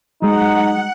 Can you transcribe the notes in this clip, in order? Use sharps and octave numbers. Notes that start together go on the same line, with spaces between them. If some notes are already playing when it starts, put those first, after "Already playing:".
F#3 G#3 D#4 F#5